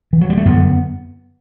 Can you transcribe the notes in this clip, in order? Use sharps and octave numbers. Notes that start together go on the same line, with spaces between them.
E3
F#3
G3
A3
F#2 D3 B3